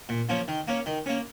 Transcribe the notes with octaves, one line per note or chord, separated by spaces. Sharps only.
A#2
F3 A#3 C#4
D#3
A#3 C#4
D#3
A#3 C#4